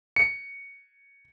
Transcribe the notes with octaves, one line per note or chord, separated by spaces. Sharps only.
C#7